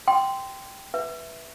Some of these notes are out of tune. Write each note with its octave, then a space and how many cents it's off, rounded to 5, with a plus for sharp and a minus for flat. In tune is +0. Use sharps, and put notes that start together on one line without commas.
G5 +0 C6 -15
B4 -15 E5 +0